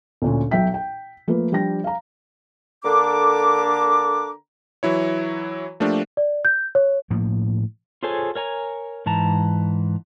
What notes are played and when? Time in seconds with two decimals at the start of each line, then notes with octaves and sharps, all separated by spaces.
0.22 D2 A#2 C#4
0.51 B1 F#3 E5 G5 B6
0.74 G5
1.28 F3 A3 A#3 F4 A#4 B4
1.52 F3 G3 D4 G5 A#6
1.84 F5 A#5
2.83 D3 A#3 D4 A4 A#5 D6
4.83 E3 F#3 E4 C#5
5.80 F3 A3 A#3 D4 G4
6.17 D5
6.45 G6
6.75 C#5
7.11 A2 F3 A#3
8.03 F4 G#4 A4 C5 C#5 G#5
8.35 A#4 C#5 G#5 A#5
9.06 G#2 E3 A5 A#5